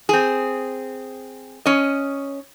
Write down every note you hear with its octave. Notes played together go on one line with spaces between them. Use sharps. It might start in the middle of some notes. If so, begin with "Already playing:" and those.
C4 G#4
C#4 D#5